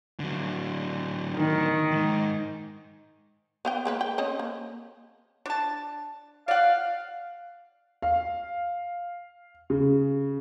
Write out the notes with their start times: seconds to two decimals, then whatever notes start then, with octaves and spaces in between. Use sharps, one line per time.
0.20 D3 F#3
1.36 D#3
1.91 E2 G#2
3.65 B3 F5 G5
3.85 G#3 A#3 B4
4.01 G5
4.18 C4 C#4 D#5
4.39 A#3
5.46 D4 A5
6.48 D5 F5 F#5
8.02 F5
9.70 C#3